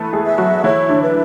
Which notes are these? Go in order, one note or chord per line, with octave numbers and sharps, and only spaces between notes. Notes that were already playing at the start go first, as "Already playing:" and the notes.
Already playing: E3 A3 B3 E4 A4 B4
G#3 G#4
E5
F#3 F#4
E3 E4 C#5
D3 D4
B4